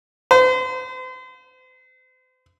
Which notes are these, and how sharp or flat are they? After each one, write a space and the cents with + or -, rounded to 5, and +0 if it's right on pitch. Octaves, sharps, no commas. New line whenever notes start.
C5 -40